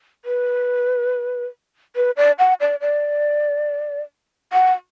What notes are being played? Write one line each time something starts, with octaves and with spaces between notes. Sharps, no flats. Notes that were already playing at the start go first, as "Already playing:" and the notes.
B4
B4
D5
F#5
D5
D5
F#5